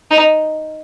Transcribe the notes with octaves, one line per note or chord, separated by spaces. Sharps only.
D#4